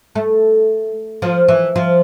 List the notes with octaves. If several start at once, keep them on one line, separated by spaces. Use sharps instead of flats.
A3
F3
E3
F3